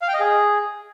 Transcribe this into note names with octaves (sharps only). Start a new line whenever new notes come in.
F5
G5
D#5
G#4